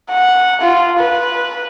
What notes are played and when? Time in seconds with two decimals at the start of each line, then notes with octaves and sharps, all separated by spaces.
0.10 F#5
0.61 F4
0.99 B4